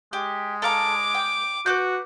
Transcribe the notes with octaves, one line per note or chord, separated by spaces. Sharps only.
G#3 G4
A4 F5 A#5 D6
G5
F#4 B4 D6 G6